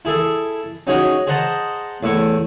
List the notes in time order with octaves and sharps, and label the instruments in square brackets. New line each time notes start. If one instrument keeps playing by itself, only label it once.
[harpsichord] E4 G#4 A4 E5
C#4 D#4 F#4 G#4 C#5 D#5
G#4 C5 D#5 F#5 A5 A#5
E2 A2 E4 C#6